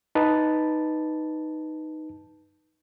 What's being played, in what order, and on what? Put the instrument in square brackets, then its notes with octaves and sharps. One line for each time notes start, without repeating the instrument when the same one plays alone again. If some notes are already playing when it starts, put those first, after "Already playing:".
[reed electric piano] D#4 B4 A5